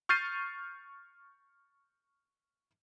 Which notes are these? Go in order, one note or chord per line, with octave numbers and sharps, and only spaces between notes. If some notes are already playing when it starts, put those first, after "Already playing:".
C#6 F6 G6 A6 C7 D#7